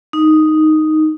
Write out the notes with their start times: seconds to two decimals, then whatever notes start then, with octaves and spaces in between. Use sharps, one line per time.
0.13 D#4